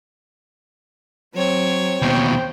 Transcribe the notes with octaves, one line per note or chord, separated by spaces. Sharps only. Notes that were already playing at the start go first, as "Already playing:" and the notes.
F#3 C4 C#5
D#2 B2 C5 G5